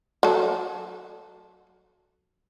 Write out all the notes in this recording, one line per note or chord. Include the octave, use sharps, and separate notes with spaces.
F#3 A4